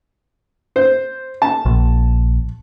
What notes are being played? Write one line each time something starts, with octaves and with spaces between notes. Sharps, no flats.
C5
A5
A#1